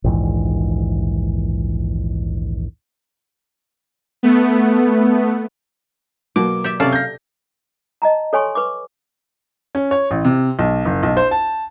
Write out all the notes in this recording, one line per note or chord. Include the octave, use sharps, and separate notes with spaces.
A#1 D#2 G#2 E3
A3 B3
B2 F#3 A#3 D6
G4 D5 E5
C3 C#4 A4 D5 F5
G6 A#6
D#5 A5 A#5
A4 C#5 G#5 C6 C#6
B4 C#6 D6
C#4
C#5
A1
C3
B1
F#1
B1
C5
A5